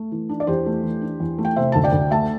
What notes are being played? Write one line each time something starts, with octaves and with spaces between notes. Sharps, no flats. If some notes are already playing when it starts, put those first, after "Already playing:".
Already playing: A3
E3
D4
D5
E2 G4 C5
A3
E3
D4
E2
A3
G5
C3 C5 E5
D2 A5
D5 G5
D2
A3 E5 A5